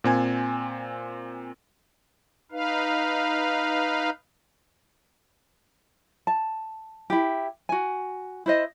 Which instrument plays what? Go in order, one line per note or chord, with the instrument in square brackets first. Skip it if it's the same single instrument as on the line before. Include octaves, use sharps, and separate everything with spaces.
[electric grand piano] A#2 C4 G#5 G#6
[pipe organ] D#4 B4 F5
[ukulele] A5
E4 G4
F#4 G#5
E4 C5 D#5